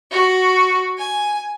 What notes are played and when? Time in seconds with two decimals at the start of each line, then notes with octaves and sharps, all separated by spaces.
0.11 F#4
0.98 G#5